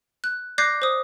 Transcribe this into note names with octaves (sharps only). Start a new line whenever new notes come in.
F#6
D5 D6 F#6 G6 A#6 C7
C5 D#6